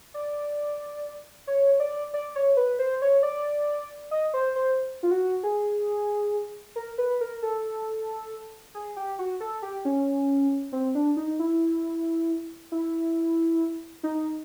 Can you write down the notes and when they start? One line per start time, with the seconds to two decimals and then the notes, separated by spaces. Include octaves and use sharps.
0.14 D5
1.47 C#5
1.80 D5
2.14 D5
2.36 C#5
2.57 B4
2.79 C5
3.02 C#5
3.23 D5
4.11 D#5
4.34 C5
4.56 C5
5.03 F4
5.11 F#4
5.43 G#4
6.76 A#4
6.98 B4
7.21 A#4
7.42 A4
8.74 G#4
8.96 G4
9.19 F#4
9.40 A4
9.62 G4
9.85 C#4
10.72 C4
10.95 D4
11.17 D#4
11.39 E4
12.72 E4
14.03 D#4